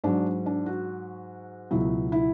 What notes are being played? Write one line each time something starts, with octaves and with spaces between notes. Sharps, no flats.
G#2 F#3 D4
D4
F#4
C#2 B2 F#3 E4
E4